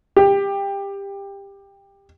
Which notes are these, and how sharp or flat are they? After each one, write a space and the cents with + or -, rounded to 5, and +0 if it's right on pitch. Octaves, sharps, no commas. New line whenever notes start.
G4 +20